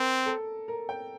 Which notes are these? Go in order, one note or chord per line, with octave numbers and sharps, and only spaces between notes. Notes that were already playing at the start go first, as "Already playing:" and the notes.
Already playing: C4 A#4
A4
A#4
G5